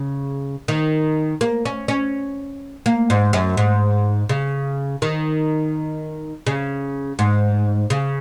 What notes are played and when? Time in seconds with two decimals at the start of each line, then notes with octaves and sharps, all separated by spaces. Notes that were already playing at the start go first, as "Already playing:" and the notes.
Already playing: C#3
0.68 D#3
1.41 A#3
1.65 C#4
1.88 C#4
2.86 A#3
3.10 G#2
3.33 F#2
3.57 G#2
4.29 C#3
5.02 D#3
6.47 C#3
7.19 G#2
7.90 C#3